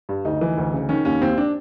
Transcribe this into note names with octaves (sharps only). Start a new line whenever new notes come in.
G2
D2 D#4
E3
D2
C#3
D#3 C#4
D#2 C#4
D#2 C4
D4